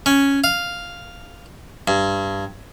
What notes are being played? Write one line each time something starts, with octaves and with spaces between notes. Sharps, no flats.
C#4
F5
G2